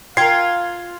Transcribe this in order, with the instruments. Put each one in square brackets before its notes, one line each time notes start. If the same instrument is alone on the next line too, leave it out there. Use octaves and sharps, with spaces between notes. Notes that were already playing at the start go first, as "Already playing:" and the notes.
[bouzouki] F4 [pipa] A#4 G5 [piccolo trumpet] F5 [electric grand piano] G#6 C7